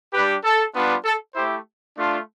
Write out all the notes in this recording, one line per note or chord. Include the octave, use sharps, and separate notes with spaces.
G3 D4 G4 B4
A4
G3 B3 D4 F4
A4
A3 E4 G4 C5
A3 D4 F4